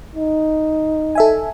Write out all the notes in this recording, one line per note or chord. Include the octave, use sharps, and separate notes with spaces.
D#4
A4 E5 G#5